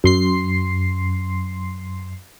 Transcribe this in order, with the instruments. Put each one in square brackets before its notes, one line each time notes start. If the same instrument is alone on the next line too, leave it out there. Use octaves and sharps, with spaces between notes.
[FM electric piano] F#2 C6 C7